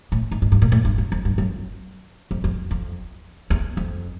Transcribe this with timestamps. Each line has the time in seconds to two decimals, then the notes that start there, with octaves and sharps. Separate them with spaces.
0.12 A2
0.31 G#2
0.42 G#2
0.52 G2
0.62 A#2
0.72 A2
0.85 G2
0.98 F#2
1.12 F2
1.25 G2
1.38 F#2
2.31 F2
2.44 F2
2.71 F2
3.50 E2
3.77 F2